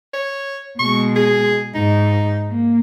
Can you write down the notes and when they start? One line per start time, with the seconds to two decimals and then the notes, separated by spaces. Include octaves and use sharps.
0.13 C#5
0.79 B2 G#3 C#6
1.16 G#4
1.75 G#2 D#4
2.50 A#3